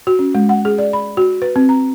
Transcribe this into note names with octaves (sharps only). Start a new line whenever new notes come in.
F#4
C#4
G#3
F#5
G#4
D5
B5
F#4
B4
C4
A#5